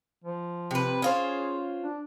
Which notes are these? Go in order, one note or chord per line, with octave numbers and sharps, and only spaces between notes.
F3
C3 B4
C#4 F4 G#4 C5
D4